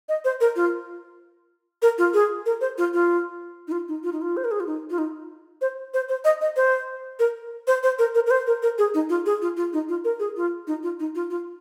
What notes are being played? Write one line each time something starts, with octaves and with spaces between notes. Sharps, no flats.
D#5
C5
A#4
F4
A#4
F4
G#4
A#4
C5
F4
F4
D#4
F4
D#4
F4
D#4
F4
C5
A#4
G#4
F4
D#4
F4
D#4
C5
C5
C5
D#5
D#5
C5
A#4
C5
C5
A#4
A#4
A#4
C5
A#4
A#4
G#4
D#4
F4
G#4
F4
F4
D#4
F4
A#4
G#4
F4
D#4
F4
D#4
F4
F4